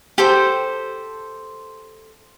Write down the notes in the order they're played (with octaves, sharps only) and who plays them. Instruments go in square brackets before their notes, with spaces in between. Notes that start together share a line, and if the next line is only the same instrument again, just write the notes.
[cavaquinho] G4 A4 C5